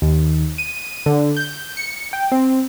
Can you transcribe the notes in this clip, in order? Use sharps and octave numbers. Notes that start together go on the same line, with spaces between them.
D#2
D#7
D3
G6
C#7
G5
C4